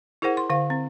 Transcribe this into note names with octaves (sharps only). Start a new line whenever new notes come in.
E4 G#4 A#4 C5 F#5
C6
D3 F5
C4